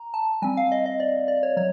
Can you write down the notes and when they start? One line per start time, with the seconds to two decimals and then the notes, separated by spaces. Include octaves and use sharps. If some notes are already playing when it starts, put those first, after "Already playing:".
Already playing: A#5
0.14 A5
0.42 G3 C4 G#5
0.57 F5
0.72 D#5
0.86 D#5
1.00 D5
1.28 D5
1.43 C#5
1.57 F#3 C#5